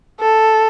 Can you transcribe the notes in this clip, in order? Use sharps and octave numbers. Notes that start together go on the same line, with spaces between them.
A4